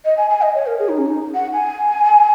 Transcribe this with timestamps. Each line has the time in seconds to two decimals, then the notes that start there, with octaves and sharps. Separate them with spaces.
0.05 D#5
0.17 G#5
0.30 G#5
0.42 D#5
0.55 C#5
0.67 A#4
0.79 G#4
0.89 D#4
0.98 C#4
1.06 D#4
1.35 F#5
1.53 G#5